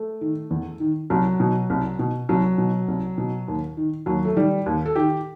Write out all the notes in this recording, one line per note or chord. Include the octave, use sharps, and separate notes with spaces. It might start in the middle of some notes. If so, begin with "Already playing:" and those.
Already playing: A3
D#3
E2
D#3
C2 F#3
B2
C2
B2
C2 F#3
B2
C2
B2
D#2
D#3
D#2 F#3
A3
D#3 G3
D#2
A4
D#3 G4